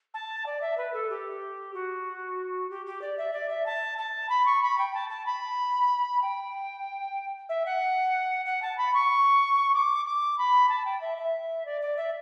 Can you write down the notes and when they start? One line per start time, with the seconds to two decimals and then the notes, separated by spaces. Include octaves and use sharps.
0.14 A5
0.46 D5
0.61 E5
0.77 B4
0.93 A4
1.10 G4
1.74 F#4
2.69 G4
2.86 G4
3.01 D5
3.17 E5
3.33 D5
3.49 E5
3.66 A5
3.98 A5
4.29 B5
4.45 C#6
4.62 B5
4.78 G5
4.94 A5
5.09 A5
5.26 B5
6.22 G5
7.49 E5
7.65 F#5
8.45 F#5
8.62 A5
8.77 B5
8.93 C#6
9.74 D6
10.05 D6
10.38 B5
10.69 A5
10.85 G5
11.01 E5
11.18 E5
11.65 D5
11.81 D5
11.97 E5